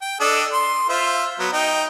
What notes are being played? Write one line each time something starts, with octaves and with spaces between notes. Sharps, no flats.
G5
D4 A4 D#5
C6
F4 C5 E5
F#3 B3
D#4 G5